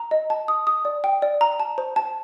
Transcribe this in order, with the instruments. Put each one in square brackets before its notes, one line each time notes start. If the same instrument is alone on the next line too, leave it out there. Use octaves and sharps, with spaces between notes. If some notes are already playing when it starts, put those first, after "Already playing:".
Already playing: [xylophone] A#5
D#5
A5
D#6
D#6
D5
G5
D5
A#5
A5
C5
A5